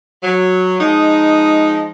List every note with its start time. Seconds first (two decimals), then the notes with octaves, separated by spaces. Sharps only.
0.23 F#3
0.80 F3 G#3 D#4